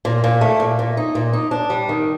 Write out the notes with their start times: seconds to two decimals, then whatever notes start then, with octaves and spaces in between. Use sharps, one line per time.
0.05 A#2
0.24 A#2
0.41 A3
0.60 A#2
0.79 A#2
0.97 D#4
1.15 A#2
1.33 D#4
1.51 D4
1.70 G3
1.89 D#3